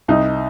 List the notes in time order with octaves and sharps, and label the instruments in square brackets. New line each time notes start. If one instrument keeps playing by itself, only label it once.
[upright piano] C2 D#4